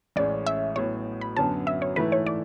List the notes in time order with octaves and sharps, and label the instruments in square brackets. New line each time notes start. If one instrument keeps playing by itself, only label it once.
[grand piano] A1 A2 G#3 C#4 [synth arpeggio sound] D5
[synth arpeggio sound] E5
[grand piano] A2 F#3 B3 [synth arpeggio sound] C#5
[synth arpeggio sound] B5
[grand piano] F#2 D3 F#3 B3 [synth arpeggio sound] A5
[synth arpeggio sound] E5
C#5
[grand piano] G#2 E3 A3 E4 [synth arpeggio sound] B4
[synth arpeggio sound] C#5
D5